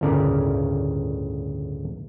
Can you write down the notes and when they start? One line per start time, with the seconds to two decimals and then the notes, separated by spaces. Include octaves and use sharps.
0.01 G1 D2 A2 C#3 A#4 D5